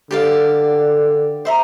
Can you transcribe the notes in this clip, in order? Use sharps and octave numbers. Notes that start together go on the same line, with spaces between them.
D3 G4 D5 F5
C5 E5 A#5